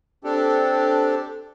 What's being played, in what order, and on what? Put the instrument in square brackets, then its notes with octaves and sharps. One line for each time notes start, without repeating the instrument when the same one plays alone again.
[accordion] C4 D4 G4 A4